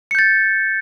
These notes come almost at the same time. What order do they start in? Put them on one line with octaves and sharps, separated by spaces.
C#7 G6 A6